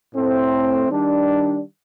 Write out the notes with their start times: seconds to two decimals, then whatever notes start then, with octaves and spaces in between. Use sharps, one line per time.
0.14 A2 A3 C4
0.89 D#3 G3 D4